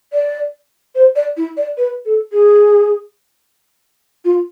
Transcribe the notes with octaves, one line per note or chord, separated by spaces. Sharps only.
D5
C5
D5
E4
D5
B4
A4
G#4
F4